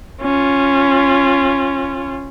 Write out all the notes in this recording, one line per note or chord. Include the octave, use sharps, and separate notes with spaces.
C#4 F4